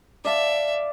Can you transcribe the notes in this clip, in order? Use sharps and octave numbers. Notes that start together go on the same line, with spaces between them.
D5 E5 F5 A5